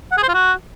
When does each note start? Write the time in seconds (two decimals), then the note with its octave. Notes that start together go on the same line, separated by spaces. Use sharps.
0.12 F#5
0.17 G#4
0.23 C5
0.29 F4
0.34 F#4